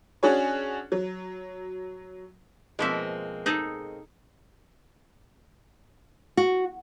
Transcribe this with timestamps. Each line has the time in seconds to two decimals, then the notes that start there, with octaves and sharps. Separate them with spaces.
0.23 C#4 D4 F#4 G#4 C#5
0.92 F#3
2.79 B2 F3 G#3 A#3 C4 E5
3.46 D#4 G#4 A4
6.37 F#4